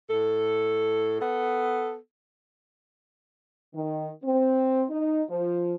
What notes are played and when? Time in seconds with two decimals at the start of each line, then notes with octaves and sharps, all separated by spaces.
0.10 A2 A4
1.21 B3 A4
3.74 D#3
4.23 C4
4.90 D#4
5.30 F3